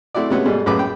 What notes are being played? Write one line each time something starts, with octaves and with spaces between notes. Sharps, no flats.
A3 C4 E4 F#4 D5
C3 G#3 A3 B3 C#4 F#4
G#2 B2 G3 A3
A#1 F#2 A2 G#4 B4 D6
G5